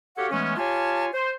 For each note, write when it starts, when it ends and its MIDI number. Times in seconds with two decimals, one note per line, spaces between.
0.17 0.28 66
0.17 0.28 67
0.17 0.28 69
0.17 0.28 73
0.17 0.28 77
0.17 0.28 78
0.31 0.55 52
0.31 0.55 56
0.31 0.55 57
0.31 0.55 59
0.31 0.55 61
0.57 1.07 65
0.57 1.07 67
0.57 1.07 73
0.57 1.07 77
0.57 1.07 80
0.57 1.07 81
1.13 1.30 72